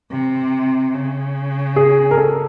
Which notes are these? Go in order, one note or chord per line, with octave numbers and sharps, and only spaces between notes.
C3
C#3
G#4
A#4
A4